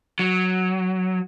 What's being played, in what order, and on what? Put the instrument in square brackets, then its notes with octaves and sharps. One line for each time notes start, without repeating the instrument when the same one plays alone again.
[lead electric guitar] F#3